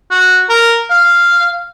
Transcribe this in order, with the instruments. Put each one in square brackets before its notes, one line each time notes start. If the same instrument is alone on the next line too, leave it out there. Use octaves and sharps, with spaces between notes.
[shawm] F#4
A#4
F5